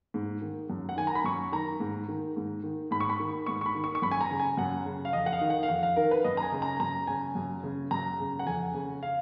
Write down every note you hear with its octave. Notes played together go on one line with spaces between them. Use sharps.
G#2
D#3
F#2
F#5
D#3 G#5
A#5
B5
F#2 C#6
D#3 A#5
G#2
D#3
G#2
D#3
G#2 B5
C#6
B5
D#3
G#2 C#6
C#6
B5
D#3
C#6
C#6
F#2 B5
G#5
A#5
C#3
G#5
F#2 F#5
C#3
F5
F2 D#5
F#5
F5
D#3
F#5
F5
F2 F#5
F5
D#3 A#4
B4
F#2 D#5
A#5
G#5
C#3
A#5
F#2 A#5
C#3 G#5
F#2
C#3
F#2 A#5
C#3
F#5
F2 G#5
C#3
F5